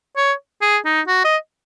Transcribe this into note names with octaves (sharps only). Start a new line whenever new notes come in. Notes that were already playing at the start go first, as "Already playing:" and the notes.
C#5
G#4
D#4
F#4
D#5